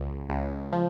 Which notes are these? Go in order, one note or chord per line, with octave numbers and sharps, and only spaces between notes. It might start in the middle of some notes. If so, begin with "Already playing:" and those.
Already playing: C#2
C#2
F3